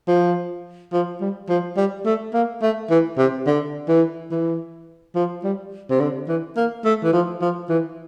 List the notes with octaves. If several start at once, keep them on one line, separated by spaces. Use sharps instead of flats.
F3
F3
G3
F3
G3
A3
A#3
A3
E3
C3
D3
E3
E3
F3
G3
C3
D3
E3
A#3
A3
E3
F3
F3
E3